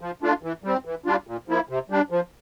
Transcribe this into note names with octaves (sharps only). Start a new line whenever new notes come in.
F3
A3 D4 F4
E3
G3 C4
E3
G3 D4 F4
A#2
F3 A#3 E4
C3
G3 D4
F3